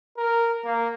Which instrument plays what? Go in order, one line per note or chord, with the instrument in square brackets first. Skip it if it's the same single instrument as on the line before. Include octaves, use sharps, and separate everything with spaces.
[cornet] A#4
A#3